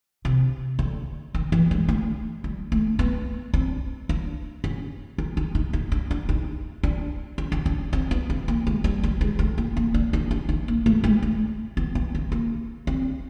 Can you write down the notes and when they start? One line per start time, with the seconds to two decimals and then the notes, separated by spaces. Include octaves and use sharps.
0.25 C3
0.79 D3
1.34 D#3
1.52 E3
1.71 G#3
1.89 A3
2.44 G3
2.72 A3
2.99 B3
3.54 C4
4.09 D4
4.64 C#4
5.18 D#4
5.37 D#4
5.55 D#4
5.73 D#4
5.92 D4
6.11 D4
6.29 D#4
6.83 D4
7.38 C#4
7.52 D4
7.66 C#4
7.93 C4
8.11 B3
8.30 C4
8.48 A#3
8.67 G#3
8.84 G3
9.03 G3
9.21 G#3
9.39 A3
9.58 A#3
9.77 A#3
9.94 D4
10.13 D#4
10.31 D4
10.49 D#4
10.68 A#3
10.86 A3
11.04 G#3
11.22 A3
11.77 B3
11.95 B3
12.15 C4
12.32 A#3
12.87 C4